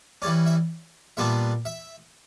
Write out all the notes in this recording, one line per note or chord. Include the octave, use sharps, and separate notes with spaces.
E3 G3 C#4 D5
E5
A#2 G3 B3 D4 E5
E5